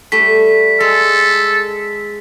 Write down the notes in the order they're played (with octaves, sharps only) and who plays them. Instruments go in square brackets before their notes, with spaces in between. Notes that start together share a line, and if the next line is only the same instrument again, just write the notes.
[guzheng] G3 A3 [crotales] B6
[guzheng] G#3 [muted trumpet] A4